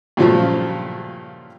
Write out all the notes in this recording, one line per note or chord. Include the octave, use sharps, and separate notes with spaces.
G2 A#2 C#3 F3 F#3 A3